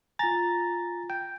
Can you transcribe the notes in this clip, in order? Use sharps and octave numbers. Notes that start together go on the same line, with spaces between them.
F4 G#5 A#5 A6
G5